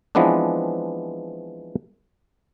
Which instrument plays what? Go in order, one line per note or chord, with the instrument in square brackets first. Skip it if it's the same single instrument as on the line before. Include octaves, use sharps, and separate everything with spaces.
[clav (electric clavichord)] E3 F3 G#3 B3 C4 D4